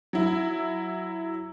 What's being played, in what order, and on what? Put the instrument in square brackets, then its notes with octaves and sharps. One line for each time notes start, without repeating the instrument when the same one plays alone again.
[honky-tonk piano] F#3 E4